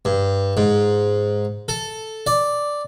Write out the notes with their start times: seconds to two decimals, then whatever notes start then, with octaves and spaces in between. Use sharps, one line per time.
0.05 G2
0.57 G#2
1.68 A4
2.27 D5